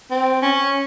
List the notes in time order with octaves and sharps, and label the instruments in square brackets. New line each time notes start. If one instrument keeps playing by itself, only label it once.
[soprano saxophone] C4
C#4